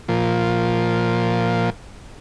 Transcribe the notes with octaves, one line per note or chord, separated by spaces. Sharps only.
A#2 F3